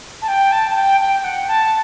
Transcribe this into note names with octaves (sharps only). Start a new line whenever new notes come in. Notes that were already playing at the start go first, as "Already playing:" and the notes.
A5
G5
A5
A5
G5
G5
F#5
A5